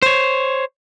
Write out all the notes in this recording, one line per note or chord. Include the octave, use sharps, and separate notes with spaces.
C5 C#5